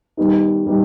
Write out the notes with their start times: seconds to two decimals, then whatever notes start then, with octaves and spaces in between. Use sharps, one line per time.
0.17 D#3 G3 B3 D#4
0.65 D#3 G3 B3 D#4